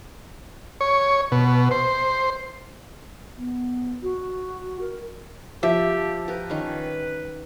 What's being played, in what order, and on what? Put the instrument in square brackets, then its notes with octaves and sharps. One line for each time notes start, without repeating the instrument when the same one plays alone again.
[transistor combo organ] C#5
B2
C5
[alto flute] B3
F#4
A#4
[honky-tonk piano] F3 [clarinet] G4 [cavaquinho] E5
[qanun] G4 A#4 [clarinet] B4
[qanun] D#3 C#4